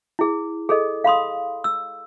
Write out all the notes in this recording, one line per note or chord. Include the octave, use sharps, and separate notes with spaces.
E4 G#4
G#4 A4 D#5
F5 B5 C6 D#6
E6